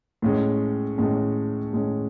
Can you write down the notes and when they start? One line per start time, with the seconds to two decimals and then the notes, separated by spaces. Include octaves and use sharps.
0.22 A2 G#3 C#4
0.98 A2 G#3 C#4
1.73 A2 G#3 C#4